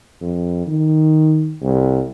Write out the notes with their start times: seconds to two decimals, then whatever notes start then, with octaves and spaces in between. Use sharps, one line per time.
0.21 F2
0.66 D#3
1.62 C2